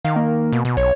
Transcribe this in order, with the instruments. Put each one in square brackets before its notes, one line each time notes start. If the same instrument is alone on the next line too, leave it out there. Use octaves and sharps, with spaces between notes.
[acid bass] D#3 [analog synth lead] F5
[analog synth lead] A#3
[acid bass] B2
B2
[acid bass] B1 [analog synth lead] C#5